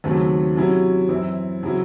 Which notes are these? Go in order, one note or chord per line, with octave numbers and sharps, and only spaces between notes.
D#2 C#3 F#3 A3 C4
C3 F#3 C#4 E4
F#2 E3 C4 E4
C#3 F#3 C4 E4